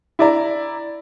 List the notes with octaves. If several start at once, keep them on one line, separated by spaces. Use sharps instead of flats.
E4 D5 A#5